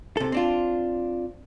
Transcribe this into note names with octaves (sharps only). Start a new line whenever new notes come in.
C3 A4
C4 D4 F4